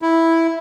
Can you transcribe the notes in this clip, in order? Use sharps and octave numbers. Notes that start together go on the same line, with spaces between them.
E4